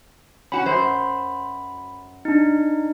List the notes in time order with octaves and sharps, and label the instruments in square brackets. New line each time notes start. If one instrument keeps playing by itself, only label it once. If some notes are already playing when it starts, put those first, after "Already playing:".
[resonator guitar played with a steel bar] C#4 F#4 [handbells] B5
[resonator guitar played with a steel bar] F#2 C5
[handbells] D4 D#4